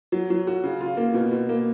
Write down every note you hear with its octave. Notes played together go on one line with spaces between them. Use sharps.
F#3
F#3
F#4
C#3
F4
A#3
B2
B2
A#3